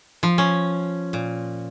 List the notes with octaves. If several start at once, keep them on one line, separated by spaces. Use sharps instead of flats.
F3
C#4
A#2